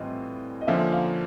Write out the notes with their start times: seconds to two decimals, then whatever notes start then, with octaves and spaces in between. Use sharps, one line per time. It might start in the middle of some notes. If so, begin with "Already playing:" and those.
Already playing: A2 E3 G3 C4 F4 D#5
0.61 D#5
0.67 D3 F3 A#3 C#4 E5
0.92 F5